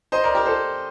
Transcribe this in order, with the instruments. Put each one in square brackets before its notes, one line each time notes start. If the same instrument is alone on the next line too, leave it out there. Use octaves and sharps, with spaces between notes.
[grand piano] C5 D#5
A#4 D5
G4 A#4
A4 C5